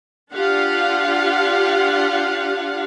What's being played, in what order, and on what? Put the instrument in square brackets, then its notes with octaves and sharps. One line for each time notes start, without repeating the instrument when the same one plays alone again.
[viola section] D4 F4 G4 F5 F#5